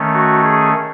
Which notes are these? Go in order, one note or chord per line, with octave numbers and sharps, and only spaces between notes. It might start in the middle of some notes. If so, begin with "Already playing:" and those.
Already playing: D#3 A3 C#4
F#4
G#4